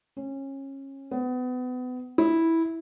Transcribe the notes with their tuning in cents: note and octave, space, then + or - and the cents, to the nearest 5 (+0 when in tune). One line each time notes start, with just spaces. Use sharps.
C#4 -25
B3 +30
E4 -10